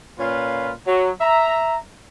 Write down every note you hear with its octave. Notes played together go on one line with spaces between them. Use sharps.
A#2 C#4 F4 B4 F5
F#3
E5 A#5